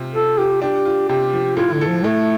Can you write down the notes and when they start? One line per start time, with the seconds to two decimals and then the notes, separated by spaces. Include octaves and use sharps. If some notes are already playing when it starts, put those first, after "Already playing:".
Already playing: C3 F4
0.14 F4 A4
0.38 F4 G4
0.62 D4 G4
0.85 F4
1.09 C3 G4
1.33 F3
1.57 A2 F4
1.73 D3
1.81 A4
1.89 F3
2.04 A2 A3